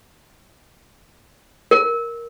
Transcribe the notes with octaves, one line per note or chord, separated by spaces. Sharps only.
A#4